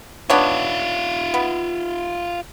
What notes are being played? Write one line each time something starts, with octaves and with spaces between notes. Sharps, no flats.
B3 D4 F4 C#5 E5
B3